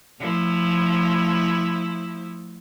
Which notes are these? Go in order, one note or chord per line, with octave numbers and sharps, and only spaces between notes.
F3 A3 E4